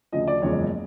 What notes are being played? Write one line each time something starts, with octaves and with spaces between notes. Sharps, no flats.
D2 C#3 F3 D#5
D5
F#1 E2 C#3 F3 G#3 C#5